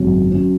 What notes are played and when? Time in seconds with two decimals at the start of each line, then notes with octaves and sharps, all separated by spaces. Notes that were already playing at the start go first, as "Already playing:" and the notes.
Already playing: G#1 F#2 C#3 F#3 C#4
0.31 F#3 C#4